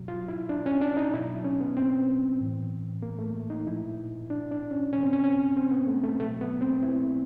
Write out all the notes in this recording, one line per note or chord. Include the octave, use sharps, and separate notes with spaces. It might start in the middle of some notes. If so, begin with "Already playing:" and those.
Already playing: B2 F#3
F4
E4
D4
C#4
D4
D#4
B2 F#3 E4
C#4
B3
C4
A2 E3
A#3
A3
D#4
A#2 F3 E4
D4
D4
C#4
C3 F3 C#4
C4
C#4
C#4
C4
B3
A3
A3
B2 F#3 A3
B3
C4
E4